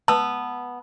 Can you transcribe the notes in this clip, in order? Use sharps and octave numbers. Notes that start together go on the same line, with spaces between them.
B3 A5 E6